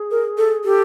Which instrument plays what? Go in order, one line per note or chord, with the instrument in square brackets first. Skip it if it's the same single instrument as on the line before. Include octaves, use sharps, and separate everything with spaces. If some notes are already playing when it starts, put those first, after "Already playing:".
Already playing: [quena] G#4
[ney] A#4
A4
[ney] G4 [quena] A4